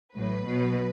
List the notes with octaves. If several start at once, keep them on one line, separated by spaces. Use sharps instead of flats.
A1 A2 F#3 B4
B1 B2 F#3